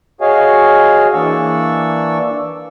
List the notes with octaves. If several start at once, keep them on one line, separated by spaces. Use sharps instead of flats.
F#4 G#4 C#5 D#5 F5 G#5
E3 A#3 D4 D5 C#6 E6